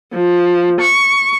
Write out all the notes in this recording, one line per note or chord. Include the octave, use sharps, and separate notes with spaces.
F3
C#6